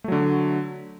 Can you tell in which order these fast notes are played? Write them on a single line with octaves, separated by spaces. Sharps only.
A3 F#3 D3